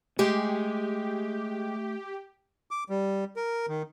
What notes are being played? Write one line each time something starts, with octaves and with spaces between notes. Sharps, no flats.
G#3 A3 G4
D6
G3
A#4
D#3